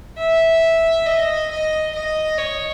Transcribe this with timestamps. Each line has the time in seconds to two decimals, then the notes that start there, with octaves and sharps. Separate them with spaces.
0.18 E5
1.06 D#5
1.51 D#5
1.95 D#5
2.38 C#5